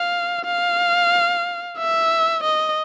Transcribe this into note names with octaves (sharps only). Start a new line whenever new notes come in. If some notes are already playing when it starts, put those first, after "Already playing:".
Already playing: F5
F5
E5
D#5